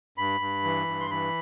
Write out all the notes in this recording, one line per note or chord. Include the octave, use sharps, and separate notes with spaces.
G2 B5
G2
E3
G2
C6
E3 B5